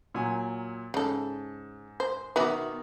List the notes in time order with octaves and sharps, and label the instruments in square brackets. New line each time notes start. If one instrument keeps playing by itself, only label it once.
[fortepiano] A#2 F#3 G#5
[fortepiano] G#2 [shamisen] C#3 A4
[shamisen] C5
[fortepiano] B2 D#3 D6 [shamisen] B3 F#4 E5